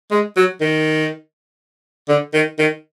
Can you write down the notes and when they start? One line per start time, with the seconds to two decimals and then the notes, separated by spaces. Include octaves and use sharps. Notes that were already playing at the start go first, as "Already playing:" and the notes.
0.11 G#3
0.37 F#3
0.61 D#3
2.09 D3
2.34 D#3
2.59 D#3